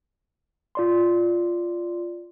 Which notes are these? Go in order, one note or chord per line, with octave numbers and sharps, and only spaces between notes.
F4 D5 C6